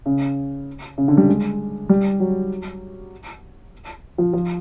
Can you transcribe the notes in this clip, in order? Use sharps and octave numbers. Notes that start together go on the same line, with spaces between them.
C#3
C#3
D3
G3
G#3
G3
F#3
F3
F3